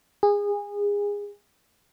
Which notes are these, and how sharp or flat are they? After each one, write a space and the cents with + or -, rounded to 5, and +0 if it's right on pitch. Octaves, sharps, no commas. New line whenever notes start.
G#4 -25